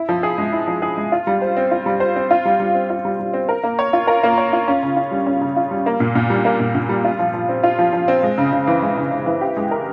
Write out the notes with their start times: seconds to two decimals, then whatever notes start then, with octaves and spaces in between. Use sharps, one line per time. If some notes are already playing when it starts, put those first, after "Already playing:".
Already playing: E4
0.09 F3
0.23 G#4
0.38 G#3
0.52 E4
0.67 F3
0.82 G#4
0.97 G#3
1.12 F4
1.27 G3
1.42 C5
1.56 C4
1.71 F4
1.86 G3
2.00 C5
2.16 C4
2.31 F4
2.45 G3
2.60 G3
2.75 C4
2.90 F4
3.05 G3
3.19 G3
3.33 C4
3.49 A#4
3.64 A#3
3.79 C#5
3.93 F4
4.07 A#4
4.23 A#3
4.38 C#5
4.53 F4
4.68 C#4
4.83 C#3
4.96 F4
5.12 G3
5.26 C#4
5.41 C#3
5.56 F4
5.71 G3
5.86 A#3
6.00 A#2
6.15 A#2
6.30 G3
6.45 A#3
6.60 A#2
6.75 A#2
6.89 G3
7.05 F4
7.19 F3
7.34 F3
7.49 C4
7.63 F4
7.79 F3
7.93 F3
8.08 C4
8.23 G#3
8.38 C#3
8.53 C#3
8.67 E3
8.82 G#3
8.97 C#3
9.11 C#3
9.26 E3
9.41 G4
9.57 G#3
9.71 A#4